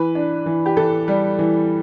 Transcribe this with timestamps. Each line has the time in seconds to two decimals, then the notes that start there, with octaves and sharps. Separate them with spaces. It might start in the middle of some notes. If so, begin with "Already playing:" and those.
Already playing: E3 B4
0.15 D4
0.46 E3
0.66 G4
0.77 E3 A4
1.08 G3
1.39 E3